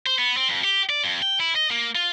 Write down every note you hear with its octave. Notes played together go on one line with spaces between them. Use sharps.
C5
B3
C4
F2
G4
D5
F2
G5
E4
D#5
A#3
F4